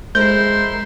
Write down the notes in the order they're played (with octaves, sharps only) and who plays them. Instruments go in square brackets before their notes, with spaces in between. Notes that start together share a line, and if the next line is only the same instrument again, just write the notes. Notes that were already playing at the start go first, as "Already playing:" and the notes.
[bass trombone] G#3 [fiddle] E4 C6 [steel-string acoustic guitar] A#4 C5 [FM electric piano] G6